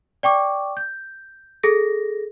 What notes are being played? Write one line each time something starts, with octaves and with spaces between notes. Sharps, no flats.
D5 G5 C#6 D6
G6
G#4 A4 A#6